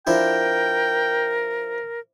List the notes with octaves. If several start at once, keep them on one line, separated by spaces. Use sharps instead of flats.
F3 D4 E4 A#4 G5